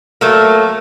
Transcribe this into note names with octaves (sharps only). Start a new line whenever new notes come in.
F#3 A3 A#3